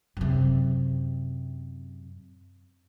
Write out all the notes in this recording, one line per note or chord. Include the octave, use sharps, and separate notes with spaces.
F#2 C3